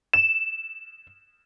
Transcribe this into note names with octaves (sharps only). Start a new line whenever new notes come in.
E7